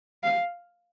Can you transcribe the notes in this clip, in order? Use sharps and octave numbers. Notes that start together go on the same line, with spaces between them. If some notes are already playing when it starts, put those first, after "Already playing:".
F5